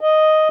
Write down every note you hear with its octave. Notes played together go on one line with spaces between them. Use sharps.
D#5